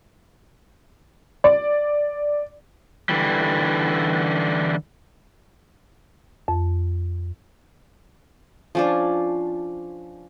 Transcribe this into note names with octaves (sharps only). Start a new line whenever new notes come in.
D5
D3 E3 G3
F2
F3 C#4 D4